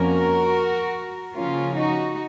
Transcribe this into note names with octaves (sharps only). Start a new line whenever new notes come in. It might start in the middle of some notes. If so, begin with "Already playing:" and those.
Already playing: F2 F3 A#3 C#4 F#4 A#4
C#3 F3 A#3 C#4 F4
D#4 F#4